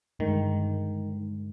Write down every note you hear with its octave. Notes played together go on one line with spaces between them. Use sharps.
G2 D3 D#3 G#3